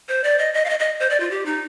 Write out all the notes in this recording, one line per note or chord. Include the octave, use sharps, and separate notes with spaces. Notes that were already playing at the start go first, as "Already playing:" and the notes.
C5
D5
D#5
D#5
F5
D#5
D#5
C5
D5
F4
G4
D#4